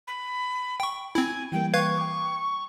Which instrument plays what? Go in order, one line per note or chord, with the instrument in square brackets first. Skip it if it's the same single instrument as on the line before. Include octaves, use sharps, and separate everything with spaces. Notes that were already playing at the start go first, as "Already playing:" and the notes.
[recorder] B5
[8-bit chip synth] G5 C#6
[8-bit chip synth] C4 E4 [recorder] G#5
[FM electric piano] E3 G3 A#3 [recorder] G5
[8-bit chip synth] B4 F5 G#6 [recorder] C#6
[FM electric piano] G5 D6